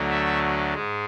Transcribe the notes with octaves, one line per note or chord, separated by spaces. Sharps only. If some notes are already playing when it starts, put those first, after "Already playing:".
Already playing: D2 D3 F#3 A3
E5
G#2 G#3